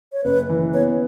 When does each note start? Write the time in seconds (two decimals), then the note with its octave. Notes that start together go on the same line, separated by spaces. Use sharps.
0.13 C#5
0.24 F#1 B4
0.49 E3
0.74 B3 C#5